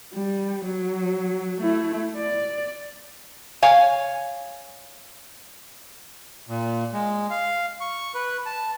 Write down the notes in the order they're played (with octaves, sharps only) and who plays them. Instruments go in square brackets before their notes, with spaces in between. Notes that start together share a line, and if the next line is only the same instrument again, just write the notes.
[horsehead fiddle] G3
F#3
A3 E4
D5
[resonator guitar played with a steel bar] C#5 F5 G#5
[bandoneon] A#2
G#3
F5
C#6
B4
A5